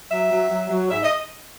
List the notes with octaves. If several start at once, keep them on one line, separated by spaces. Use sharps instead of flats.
F#3 E5
F#3
F#3
F#3
G#2 E5
D#5